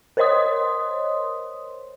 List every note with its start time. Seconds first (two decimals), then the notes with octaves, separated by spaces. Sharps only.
0.17 A#4 C5 C#5 D#5 C6 D#6